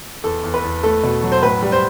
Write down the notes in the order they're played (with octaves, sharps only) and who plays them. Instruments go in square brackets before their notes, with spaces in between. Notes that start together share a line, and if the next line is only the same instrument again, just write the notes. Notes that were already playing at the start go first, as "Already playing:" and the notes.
[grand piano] E2 [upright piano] A4
[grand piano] E2
[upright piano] B4
[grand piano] E2
[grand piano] A3 [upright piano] A4
[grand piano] B2
F#3
[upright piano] C5
[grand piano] A2 [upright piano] B4
[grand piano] G3
[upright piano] C5